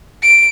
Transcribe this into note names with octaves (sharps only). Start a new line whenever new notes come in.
D7